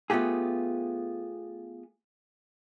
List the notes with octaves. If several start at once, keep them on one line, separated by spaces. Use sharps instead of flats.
A3 B3 F4 G4 G#4